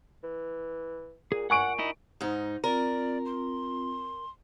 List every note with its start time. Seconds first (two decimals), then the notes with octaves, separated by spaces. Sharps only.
0.23 E3
1.32 A#2 G#4
1.50 A#2 F#5 G#5 C#6 F#6 D7
1.79 D#4 E4 D#5
2.21 G#2 D#4
2.64 C4 F4 A#4 D5
3.26 C6